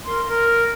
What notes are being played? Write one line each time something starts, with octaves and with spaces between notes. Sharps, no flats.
A#4 C6
A#4